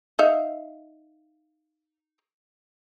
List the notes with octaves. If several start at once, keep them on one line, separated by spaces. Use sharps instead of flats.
D#4 E5 F5